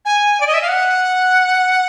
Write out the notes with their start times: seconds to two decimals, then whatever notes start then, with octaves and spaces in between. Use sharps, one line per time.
0.05 G#5
0.40 D5
0.47 D#5
0.53 E5
0.62 F5
0.68 F#5